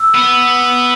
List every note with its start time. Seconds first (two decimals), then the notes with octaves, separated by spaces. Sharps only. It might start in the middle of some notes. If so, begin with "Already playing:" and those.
Already playing: E6
0.15 B3